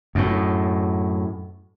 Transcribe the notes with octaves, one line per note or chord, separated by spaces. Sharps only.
F#2 A2